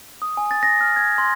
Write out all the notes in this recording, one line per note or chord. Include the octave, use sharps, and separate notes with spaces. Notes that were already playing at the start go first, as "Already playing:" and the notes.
D#6
G#5
A6
A#6
F6
G#6
C6